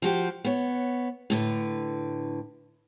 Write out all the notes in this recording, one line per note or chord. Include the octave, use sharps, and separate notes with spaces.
F3 F#4 G4
B3 C#5
A2 D3 B4